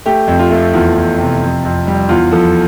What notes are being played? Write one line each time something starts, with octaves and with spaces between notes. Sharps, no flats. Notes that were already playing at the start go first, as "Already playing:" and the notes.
A3 G4
F2
F4
A3
E2 F4
E2
C3
F2
F2
G3
E2 F4
F3 A4